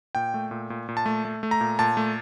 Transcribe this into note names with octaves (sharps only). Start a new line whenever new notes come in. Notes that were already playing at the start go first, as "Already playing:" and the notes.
A#2 G5
A3
A#2
A#2
A#2
A5
A3
A3
A3
A#5
A#2
A#2 A5
A3